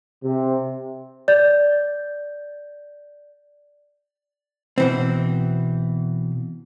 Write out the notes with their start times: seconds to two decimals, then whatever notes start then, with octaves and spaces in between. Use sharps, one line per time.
0.23 C3
1.28 D5 G6 A6
4.78 B2 E3 C4